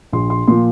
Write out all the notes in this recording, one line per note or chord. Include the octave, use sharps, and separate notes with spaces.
A#1 C6
C6
A#2 F3 C6